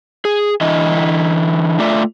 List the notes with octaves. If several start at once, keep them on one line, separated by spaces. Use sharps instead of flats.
G#4
D3 E3 E4 D#5
A3 F4 D5 E5